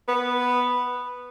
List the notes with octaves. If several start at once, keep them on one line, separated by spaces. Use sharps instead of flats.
B3